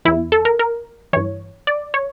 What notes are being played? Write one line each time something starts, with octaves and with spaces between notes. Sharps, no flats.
E2 E3 E4
A4
A#4
A#4
G2 E3 C#5
D5
C#5